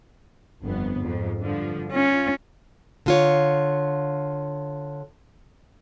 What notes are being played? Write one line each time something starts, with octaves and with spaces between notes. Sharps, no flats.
G1 F2 B3
F2 G#2
G2 D3 F3
C#4 F4
D3 F4 C#5